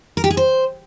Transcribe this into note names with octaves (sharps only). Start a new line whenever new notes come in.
A#4
G4
G#4
C5